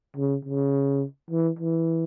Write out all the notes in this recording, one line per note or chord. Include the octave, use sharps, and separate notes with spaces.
C#3
C#3
E3
E3